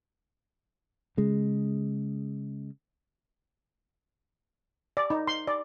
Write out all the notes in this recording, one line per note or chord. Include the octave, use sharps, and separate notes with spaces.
C#3 G#3
D5
D#4
C6
D5